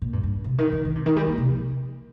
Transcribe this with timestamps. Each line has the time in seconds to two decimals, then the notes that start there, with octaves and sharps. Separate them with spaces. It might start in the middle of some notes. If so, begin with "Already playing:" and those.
0.02 A#2
0.13 G2
0.23 G2
0.44 C3
0.58 D#3
0.72 D#3
0.85 D#3
0.96 C3
1.06 D#3
1.16 G3
1.27 A#3
1.38 C3
1.49 F3